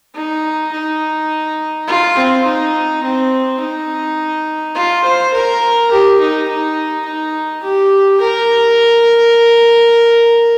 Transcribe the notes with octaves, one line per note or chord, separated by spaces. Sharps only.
D#4
D#4
F4
C4
D#4
C4
D#4
F4
C5
A#4
G4
D#4
D#4
D#4
G4
A#4